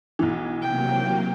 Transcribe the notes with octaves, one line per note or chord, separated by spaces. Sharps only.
B1 E3
C3 F#3 A#3 G5